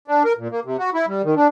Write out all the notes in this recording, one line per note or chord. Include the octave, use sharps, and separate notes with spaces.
D4
A#4
A#2
A#3
C3
F#4
E4
G3
D#3
D4